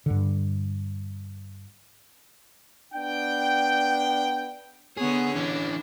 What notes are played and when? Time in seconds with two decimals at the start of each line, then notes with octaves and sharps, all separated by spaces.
0.06 G2 D3
2.94 B3 D4 G5
4.97 D3 B3 G#4 C#5
5.36 E3 C#4 D4